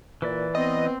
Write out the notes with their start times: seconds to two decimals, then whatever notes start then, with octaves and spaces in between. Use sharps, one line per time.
0.22 A#2 E3 B4 D5
0.55 B3 C4 D#5